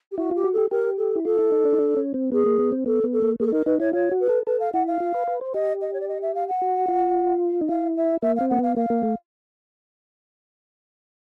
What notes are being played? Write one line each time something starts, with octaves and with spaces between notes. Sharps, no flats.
G4
E4 F#4
F4 G4
F#4
G4 A4
G4 A#4
A4
E4
F4 A4
E4
D#4
D4
D#4
D4
C#4
C4
B3 G#4
A#3
B3
C4
B3 A4
B3
A4
A#3
A#3 G#4
A4
D#4 A#4
D#4 B4
E4 C#5
F4 C#5
F#4
B4
A4
A4 B4
F5
E4 F#5
F5
F4
B4
B4
C5
G4 D#5
D#5
C#5
D5
D#5
E5
F5
F#5
F#4
F4
D#4
E4 F5
E5
A#3 E5
F5
C4
A#3 F#5
B3 F5
A#3 F5
A#3
A3